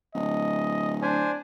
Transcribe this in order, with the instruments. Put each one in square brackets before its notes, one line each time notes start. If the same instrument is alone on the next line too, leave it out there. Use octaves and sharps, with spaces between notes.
[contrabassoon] D1 [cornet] D#5
[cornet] D4 [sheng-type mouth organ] C5 G#5